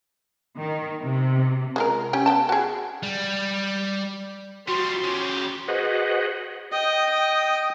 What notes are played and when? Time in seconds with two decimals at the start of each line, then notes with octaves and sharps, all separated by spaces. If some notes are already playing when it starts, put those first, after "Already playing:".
0.58 D#3
1.02 C3
1.76 G#3 F4 A#4
2.13 C#4 G4 G5
2.26 B3 G5 A5
2.49 F#4 G#4
3.03 G3
4.68 F3 G3 F#4 C6
5.04 C#3 G4
5.68 F#4 G#4 B4 C5 D#5 F#5
6.72 D#5 G5 D#6